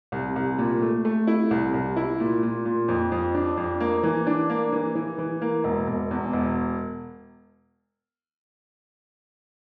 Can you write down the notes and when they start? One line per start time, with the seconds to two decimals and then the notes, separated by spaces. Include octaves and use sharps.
0.12 C2
0.36 C2
0.59 A#2
0.82 A3
1.05 A3
1.27 E4
1.51 C2
1.74 C2
1.96 E4
2.20 A#2
2.43 A#2
2.66 A#2
2.88 F2
3.12 F2
3.35 D4
3.57 F2
3.80 A#3
4.03 E3
4.27 D4
4.50 A#3
4.73 E3
4.95 E3
5.18 E3
5.42 A#3
5.64 E1
5.88 E1
6.11 E2
6.33 E1